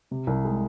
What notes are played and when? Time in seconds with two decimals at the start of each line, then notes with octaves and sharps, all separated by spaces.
0.11 C3
0.27 C2
0.45 G#3